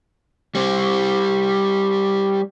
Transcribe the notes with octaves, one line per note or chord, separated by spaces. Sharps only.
G3 C4